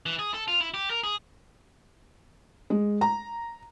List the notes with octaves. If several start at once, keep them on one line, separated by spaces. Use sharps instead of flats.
E3
G#4
A4
F4
E4
G4
A#4
G#4
G#3
A#5